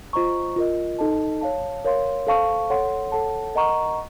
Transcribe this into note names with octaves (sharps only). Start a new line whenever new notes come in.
F4 C5 D#5 A#5 C#6
F4 A#4 D#5
D#4 A4 D#5 A5
C#5 F5 A5
A#4 C#5 F5 C6
A4 C5 F5 A5 C#6
A4 C#5 F#5 C6
A4 C#5 F#5 A5
A#4 D#5 F#5 A#5 C#6